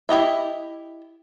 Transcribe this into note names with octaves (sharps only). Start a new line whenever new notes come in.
E4 G4 D#5 E5